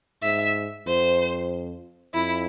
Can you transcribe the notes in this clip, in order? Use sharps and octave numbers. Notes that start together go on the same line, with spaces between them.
G#2 E5
F2 C5
F2 E4